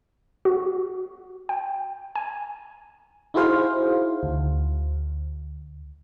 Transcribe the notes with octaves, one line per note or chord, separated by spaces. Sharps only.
F#4
G5
G#5
D#4 E4 F#4 G#4 C5 F5
D2